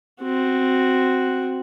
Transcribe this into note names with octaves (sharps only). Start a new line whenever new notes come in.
C4 F#4